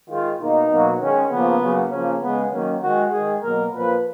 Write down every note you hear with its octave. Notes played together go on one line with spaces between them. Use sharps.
D#3 G#3 F4
B2 A#3 D#4
B2 F#3 A#3
D#3 G#3 C#4
C#3 F3 A#3 B3
C#3 F#3 A#3
C#3 F3 A#3 C#4
C#3 G#3 B3
D#3 F#3 A#3 C#4
D#3 G#3 F#4
D#3 G#3 G#4
B2 F#3 A#3 A#4
A#2 F3 A#3 B4